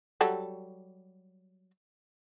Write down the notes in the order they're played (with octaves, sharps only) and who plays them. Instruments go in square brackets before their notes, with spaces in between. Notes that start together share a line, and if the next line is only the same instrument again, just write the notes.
[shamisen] F#3 G3 A4